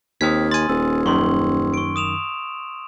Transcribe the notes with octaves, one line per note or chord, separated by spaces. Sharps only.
D#2 C4 D#6 F6 G#6 B6
G#5 C6 A6
D#1 E6
F#2 D#3 C6 C#6
C#6 D7
D#6 E7 F7